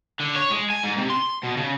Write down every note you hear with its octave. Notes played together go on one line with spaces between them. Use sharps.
D3
C#5
G#3
G#5
G#2
C3
C6
B2
C#3